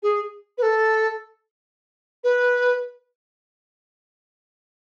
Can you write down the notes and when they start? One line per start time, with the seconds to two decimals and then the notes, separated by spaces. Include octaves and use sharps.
0.03 G#4
0.58 B4
0.63 A4
2.24 B4